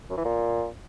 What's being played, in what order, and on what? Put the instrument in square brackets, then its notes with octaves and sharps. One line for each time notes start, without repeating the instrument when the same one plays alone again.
[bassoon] F#2
E3
A#2